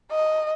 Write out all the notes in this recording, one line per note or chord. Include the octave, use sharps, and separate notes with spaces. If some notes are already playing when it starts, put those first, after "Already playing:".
D#5